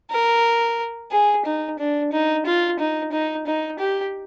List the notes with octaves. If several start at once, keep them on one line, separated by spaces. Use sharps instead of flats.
A#4
G#4
D#4
D4
D#4
F4
D#4
D#4
D#4
G4